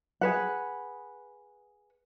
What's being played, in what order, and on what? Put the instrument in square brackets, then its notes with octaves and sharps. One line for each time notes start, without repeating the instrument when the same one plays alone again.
[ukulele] G#4 B4 F#5